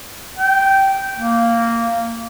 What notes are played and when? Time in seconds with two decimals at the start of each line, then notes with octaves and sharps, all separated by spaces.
0.39 G5
1.17 A#3